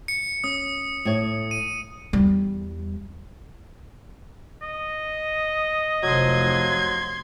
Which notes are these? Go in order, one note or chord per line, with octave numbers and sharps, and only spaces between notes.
C#7
C#4 D#6
A2 C#5
D#7
E2 G3
D#5
F1 F3 F#3 C6 G#6